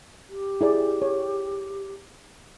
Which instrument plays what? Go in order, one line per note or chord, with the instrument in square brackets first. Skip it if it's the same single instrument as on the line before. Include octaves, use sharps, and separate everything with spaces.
[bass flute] G4
[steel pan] E4 G#4 D5
C#5